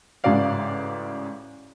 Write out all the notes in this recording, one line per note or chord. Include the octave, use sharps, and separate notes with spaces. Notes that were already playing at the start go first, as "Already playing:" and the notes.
A1 G#2 C#3 F#4 D5 F5